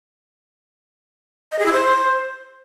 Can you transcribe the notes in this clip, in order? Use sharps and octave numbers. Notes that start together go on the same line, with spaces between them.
D#5
G#4
E4
C5